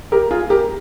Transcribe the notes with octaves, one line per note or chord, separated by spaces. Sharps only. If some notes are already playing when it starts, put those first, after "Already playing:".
G4 A#4
F4 G#4
G4 A#4